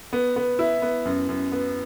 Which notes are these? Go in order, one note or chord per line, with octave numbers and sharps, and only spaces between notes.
B3
B3
E4
B3
F#2
F#2
B3